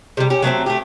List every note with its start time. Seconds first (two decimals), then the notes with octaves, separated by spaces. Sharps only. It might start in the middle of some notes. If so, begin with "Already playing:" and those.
0.17 C3 G3
0.30 C#4 G4
0.42 F#3 A3 B3 C4
0.66 A3 G4